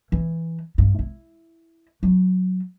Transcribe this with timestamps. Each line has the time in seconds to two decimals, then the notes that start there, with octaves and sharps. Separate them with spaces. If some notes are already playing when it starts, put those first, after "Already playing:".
0.12 E3
0.78 G2
0.99 E4
2.03 F#3